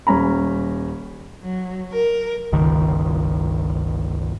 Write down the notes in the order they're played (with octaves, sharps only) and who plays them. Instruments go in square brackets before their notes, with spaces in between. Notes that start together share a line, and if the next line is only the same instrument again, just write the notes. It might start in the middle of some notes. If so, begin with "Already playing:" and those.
[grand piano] D#1 C#4 A#5 B5
[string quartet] F#3
A#4
[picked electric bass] G1 C#2 D#3